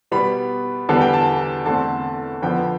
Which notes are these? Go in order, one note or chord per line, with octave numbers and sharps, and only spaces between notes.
B2 G3 B3 B5
E2 D3 G3 B3 A5
G5
A5
E2 D3 A3 C4 A5
F2 D3 F3 B3 G5